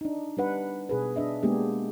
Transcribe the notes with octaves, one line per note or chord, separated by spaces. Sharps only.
D4 D#4
G3 D4 B4 F#5
B2 G#4 B4
D4 D#5 E5
G#3 A#3 B3 D4 G4 G#4